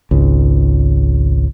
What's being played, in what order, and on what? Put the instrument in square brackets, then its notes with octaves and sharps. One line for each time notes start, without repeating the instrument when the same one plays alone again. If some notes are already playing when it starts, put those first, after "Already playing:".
[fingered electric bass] G#1 C#2